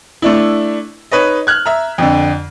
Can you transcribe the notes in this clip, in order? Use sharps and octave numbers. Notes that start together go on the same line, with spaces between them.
A3 D4 E4
D#4 B4 C#5 D#5
F6 F#6 G#6
E5 A#5
F2 D3